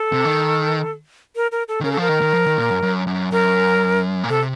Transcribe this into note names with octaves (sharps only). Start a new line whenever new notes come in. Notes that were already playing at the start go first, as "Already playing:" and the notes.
Already playing: A4
C3
D#3
A#4
A#4
A4
D#3
C#3 A#4
A4
F3 A#4
D#3
D#3
F3
D#3
A#2
F#2
F#2
F#2
F#2 A#4
A#2
C3 A4